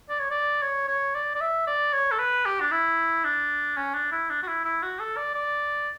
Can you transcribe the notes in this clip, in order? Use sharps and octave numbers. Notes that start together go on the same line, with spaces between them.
D5
C#5
D5
C#5
C#5
D5
D5
E5
D5
C#5
A4
B4
G4
D4
E4
D4
C#4
D4
E4
D4
F#4
E4
E4
F#4
A4
D5
D5